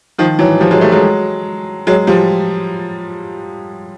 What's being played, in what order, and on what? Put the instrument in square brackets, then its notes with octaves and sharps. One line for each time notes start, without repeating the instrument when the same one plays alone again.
[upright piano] D#3 F3
E3 F#3
F3 G3
F#3 G#3
G3 A3
F#3 G#3
F#3 G#3
F3 G3